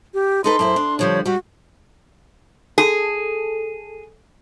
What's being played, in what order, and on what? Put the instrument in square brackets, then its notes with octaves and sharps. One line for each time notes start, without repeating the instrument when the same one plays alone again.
[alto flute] G4
[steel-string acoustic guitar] D#4 A4 B4 [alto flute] C6
[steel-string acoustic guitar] F#2 E4 C5
D4
[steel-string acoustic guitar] D3 F3 G3 [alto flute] C#5
[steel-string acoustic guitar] G3 G4 [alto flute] F#4
[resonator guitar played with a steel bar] G#4 [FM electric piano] A4